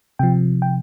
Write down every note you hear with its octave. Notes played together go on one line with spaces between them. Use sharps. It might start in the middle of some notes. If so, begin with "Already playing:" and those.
C3 F3 G5
G5